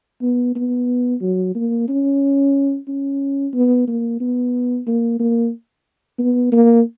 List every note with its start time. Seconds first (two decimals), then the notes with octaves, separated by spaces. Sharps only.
0.22 B3
0.55 B3
1.21 F#3
1.55 A#3
1.89 C#4
2.88 C#4
3.54 B3
3.87 A#3
4.20 B3
4.87 A#3
5.20 A#3
6.19 B3
6.52 A#3